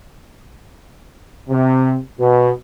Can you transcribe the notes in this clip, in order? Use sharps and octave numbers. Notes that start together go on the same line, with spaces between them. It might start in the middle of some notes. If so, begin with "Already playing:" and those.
C3
B2